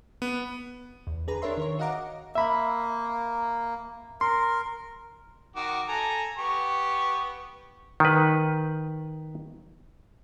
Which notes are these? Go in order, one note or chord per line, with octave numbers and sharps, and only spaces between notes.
B3
E2
D3 G#4 B4 A#5
D4 A#4 C#5 E5 C6
D#3 A#4 C#5
F#4 D#5 F5 F#5 A#5 D6
A#3 E5 B5
A#4 C6
D#3 F#4 D6
A4 G#5 A#5
B3 G4 C#6
D#3 B4